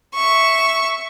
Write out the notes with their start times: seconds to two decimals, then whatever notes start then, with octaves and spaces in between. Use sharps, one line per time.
0.15 E5 C#6